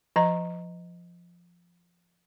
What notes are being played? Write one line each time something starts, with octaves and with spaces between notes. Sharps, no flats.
F3 D#5 A#5